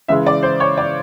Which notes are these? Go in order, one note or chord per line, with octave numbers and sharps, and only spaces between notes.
C#3 E3 G#3 E5
D5
C5
C#5
D5